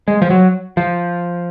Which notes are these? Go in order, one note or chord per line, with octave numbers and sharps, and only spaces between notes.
G#3
F3
F#3
F3